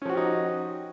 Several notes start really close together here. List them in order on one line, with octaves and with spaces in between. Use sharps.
C#4 F3 F#4 G4 D#4